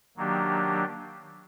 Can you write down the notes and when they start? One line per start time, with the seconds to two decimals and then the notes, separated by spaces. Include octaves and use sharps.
0.17 D#3 F#3 A#3 D4 G4